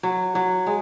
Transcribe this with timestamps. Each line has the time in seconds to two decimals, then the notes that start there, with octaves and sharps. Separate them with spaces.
0.03 F#3
0.35 F#3
0.67 G#3